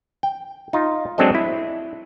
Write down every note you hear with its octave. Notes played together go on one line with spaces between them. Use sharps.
G5
D#4 F4
F#3 G#3 C4 D4 A4 D#5
E4